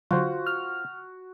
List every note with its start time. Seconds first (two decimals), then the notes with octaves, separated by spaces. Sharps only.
0.11 D3 F#3 F4 F#4 C5
0.47 F6